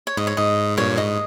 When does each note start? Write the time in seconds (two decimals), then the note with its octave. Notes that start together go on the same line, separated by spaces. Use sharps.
0.07 C#5
0.17 G#2 D#5
0.27 C#5
0.37 G#2 D#5
0.77 G2 A#2 C#5
0.97 G#2 D#5